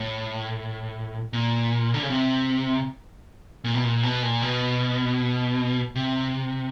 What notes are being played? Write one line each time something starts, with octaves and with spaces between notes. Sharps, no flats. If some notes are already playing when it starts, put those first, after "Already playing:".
Already playing: A2
A#2
D3
C#3
C3
A#2
B2
A#2
B2
A#2
B2
C3